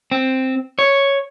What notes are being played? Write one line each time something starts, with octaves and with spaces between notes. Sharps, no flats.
C4
C#5